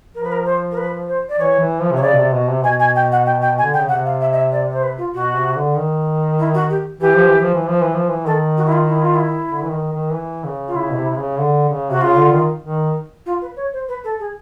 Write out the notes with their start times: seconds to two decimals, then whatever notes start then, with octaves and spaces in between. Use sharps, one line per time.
0.15 F3 A#4
0.24 B4
0.32 A#4
0.46 C5
0.71 A#4
0.77 B4
1.07 C5
1.29 D5
1.39 E3 C#5
1.59 E3
1.81 F3
1.92 C3 C#5
2.02 C#3 D5
2.13 B2
2.17 C3
2.33 B2
2.49 C3
2.64 B2 G#5
2.79 G#5
2.95 G5
3.12 F#5
3.26 G5
3.42 G5
3.58 G#5
3.63 D3
3.73 G5
3.77 C#3
3.88 C3 F#5
4.05 F5
4.20 E5
4.32 D#5
4.35 E5
4.51 D5
4.72 C5
4.83 B4
4.98 F4
5.14 B2 F#4
5.35 C3
5.56 D3
5.76 D#3
6.39 E4
6.54 F#4
6.69 G4
7.00 E3 G4
7.15 F3
7.27 E3
7.41 F3
7.55 E3
7.68 F3
7.81 E3
7.94 F3
8.09 E3
8.26 D#3 A4
8.57 F#4
8.66 E4
8.72 F4
8.88 E4
9.01 F4
9.15 E4
9.51 D3
9.64 E3
9.72 D#3
9.93 D#3
10.13 E3
10.44 C#3
10.68 F4
10.76 C#3 E4
10.91 B2
10.97 C3
11.11 C3
11.18 C#3
11.37 D3
11.69 C#3
11.90 C3 F#4
12.01 C#3 F4
12.16 D3
12.32 D#3
12.63 D#3
13.26 F4
13.41 B4
13.56 C#5
13.73 C5
13.88 B4
14.04 A4
14.19 G#4